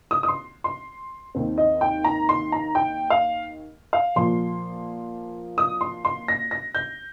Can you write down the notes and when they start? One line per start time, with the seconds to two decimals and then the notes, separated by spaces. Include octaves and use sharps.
0.11 D#6
0.23 D#6
0.28 C6
0.64 C6
1.35 D#2 D#3 C4
1.58 D#5
1.81 G5
2.04 A#5
2.29 C6
2.52 A#5
2.75 G5
3.10 F5
3.93 F5
4.16 A#2 F3 A#3 C6
5.58 D#6
5.81 C6
6.05 C6
6.28 A#6
6.51 A#6
6.75 G6